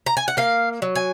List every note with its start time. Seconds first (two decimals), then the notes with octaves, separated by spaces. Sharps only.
0.06 A#5
0.17 G#5
0.28 F#5
0.37 A#3 F5
0.82 F#3
0.96 G#5